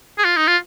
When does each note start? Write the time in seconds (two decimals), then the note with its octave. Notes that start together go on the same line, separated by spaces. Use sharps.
0.19 G#4
0.25 F4
0.37 D#4
0.48 F4